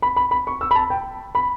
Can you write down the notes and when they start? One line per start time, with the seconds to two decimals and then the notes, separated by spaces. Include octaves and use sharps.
0.02 B5
0.16 B5
0.31 B5
0.47 C#6
0.61 E6
0.71 B5
0.75 A5
0.90 G5
1.35 B5